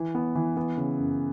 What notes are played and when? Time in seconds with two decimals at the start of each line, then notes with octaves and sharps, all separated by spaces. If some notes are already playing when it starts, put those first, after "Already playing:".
Already playing: E3
0.15 B3
0.35 E3
0.57 B3
0.77 C#3
0.98 F#2